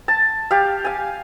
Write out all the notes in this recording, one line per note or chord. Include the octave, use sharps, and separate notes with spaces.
A5
G4 F5
F5 G#5